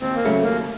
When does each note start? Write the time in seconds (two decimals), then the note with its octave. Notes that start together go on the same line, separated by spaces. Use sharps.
0.01 D#2 C4
0.15 A#3
0.25 C#3 F#3 A3 C#4
0.43 D#2 A#3